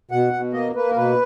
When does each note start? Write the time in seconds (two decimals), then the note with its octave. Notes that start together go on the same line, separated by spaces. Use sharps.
0.11 B2 F#5
0.33 B2
0.53 A#3 D#5
0.75 A#3 B4
0.91 A#4
0.96 B2 B4